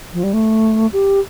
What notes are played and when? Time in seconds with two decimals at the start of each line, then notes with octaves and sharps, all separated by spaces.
0.13 F3
0.23 G3
0.33 A3
0.93 G4